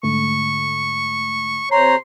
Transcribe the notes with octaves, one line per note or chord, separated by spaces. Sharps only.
G#2 D3 A3 C#6
C3 C5 C#5 A#5 C6